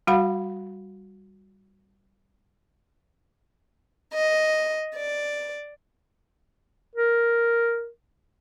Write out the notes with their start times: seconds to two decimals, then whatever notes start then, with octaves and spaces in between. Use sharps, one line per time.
0.07 G3 F#4 F5 F#5 B5
4.14 D#5
4.95 D5
6.95 A#4